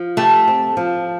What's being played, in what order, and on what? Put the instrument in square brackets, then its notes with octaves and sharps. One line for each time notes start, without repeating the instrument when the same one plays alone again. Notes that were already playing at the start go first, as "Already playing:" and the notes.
Already playing: [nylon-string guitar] F3
[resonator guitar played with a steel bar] A3 [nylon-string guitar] G4
[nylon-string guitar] C4
F3